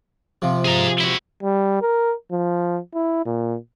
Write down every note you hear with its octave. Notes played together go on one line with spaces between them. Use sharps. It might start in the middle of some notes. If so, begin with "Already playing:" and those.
C3 F3
G#4 A#5
E4 F#4
G3
A#4
F3
E4
A#2